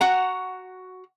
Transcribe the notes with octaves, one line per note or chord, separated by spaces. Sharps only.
F#4 F#5 A#5